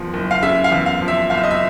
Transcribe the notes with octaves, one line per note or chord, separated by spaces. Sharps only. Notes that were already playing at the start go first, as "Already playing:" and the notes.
Already playing: F#1 E2 F3
F#1
F5
C#3 E5
F5
E2
F5
F3
E5
F#1 F5
E5
D#5
E5